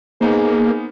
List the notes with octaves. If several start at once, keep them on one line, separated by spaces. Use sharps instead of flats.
A#3 B3 D#4 G#4 C5